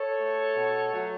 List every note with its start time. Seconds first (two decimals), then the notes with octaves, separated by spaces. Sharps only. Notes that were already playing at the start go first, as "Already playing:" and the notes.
Already playing: A4 C#5
0.20 A3
0.56 B2
0.93 F#3 A3